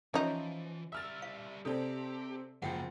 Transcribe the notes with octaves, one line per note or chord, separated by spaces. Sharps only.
E3 F3 C#4 D#4 C#5 E5
G3 E5 E6 F6 A6
F5
C3 C4 G4 A4 D5 A5
F#1 G#2 F3 A#3 F#5 G5